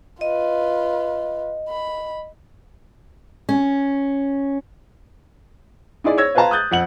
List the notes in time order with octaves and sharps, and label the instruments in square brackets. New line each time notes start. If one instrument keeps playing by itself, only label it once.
[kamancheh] F4 B4 [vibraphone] D#5
[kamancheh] B5
[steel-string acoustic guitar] C#4
[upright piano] D#4 E4 G#4 D5
C#5 E6 G#6 A#6
F4 B4 C5 F5 A5 A#5
D#6 F#6 G6 A6
F2 F#5 F#7